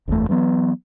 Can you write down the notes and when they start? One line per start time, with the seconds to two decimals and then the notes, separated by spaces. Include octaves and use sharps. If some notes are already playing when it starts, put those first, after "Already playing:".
0.08 F#1 E2 C#3 A3
0.29 E3 F#3 G#3 B3